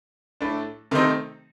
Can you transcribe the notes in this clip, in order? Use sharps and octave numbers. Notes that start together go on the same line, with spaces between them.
A2 A3 D4
C3 D#3 A3 C4 D#4